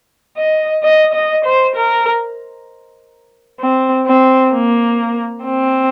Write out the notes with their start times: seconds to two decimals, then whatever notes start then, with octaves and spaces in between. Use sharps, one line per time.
0.37 D#5
0.83 D#5
1.14 D#5
1.45 C5
1.76 A#4
3.60 C4
4.07 C4
4.53 A#3
5.45 C4